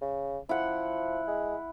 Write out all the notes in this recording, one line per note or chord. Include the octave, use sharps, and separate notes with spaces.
C#3
F3 E4 F#5
G#3